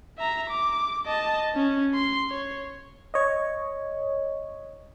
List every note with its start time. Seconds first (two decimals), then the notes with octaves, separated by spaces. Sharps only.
0.18 E5 A#5
0.50 D6
1.06 D#5 A5
1.55 C#4
1.94 C6
2.30 C#5
3.14 C#5 D#5